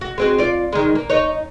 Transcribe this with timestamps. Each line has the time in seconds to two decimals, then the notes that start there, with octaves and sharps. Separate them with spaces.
0.01 F#4
0.18 G#3 C4 F#4
0.39 F4 D5
0.72 D#3 G#3
0.95 A#3
1.10 D#4 C#5